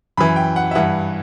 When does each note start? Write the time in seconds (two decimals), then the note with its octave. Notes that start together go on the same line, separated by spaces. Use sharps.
0.17 F#2 E3 B5
0.36 G5
0.56 F#5
0.71 E5
0.75 G2 E3 F#5